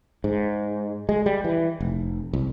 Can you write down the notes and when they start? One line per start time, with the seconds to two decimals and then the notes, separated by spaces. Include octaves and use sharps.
0.24 G#2
1.09 G#3
1.26 G3
1.44 E3
1.80 F1
2.33 C2